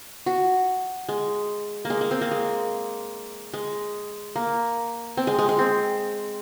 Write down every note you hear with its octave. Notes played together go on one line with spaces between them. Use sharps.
F#4
G#3
A#3
G#3
A#3
C4
A#3
G#3
G#3
A#3
C4
G#3
G#3
G#3
C4